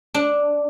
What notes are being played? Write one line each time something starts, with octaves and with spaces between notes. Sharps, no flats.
D4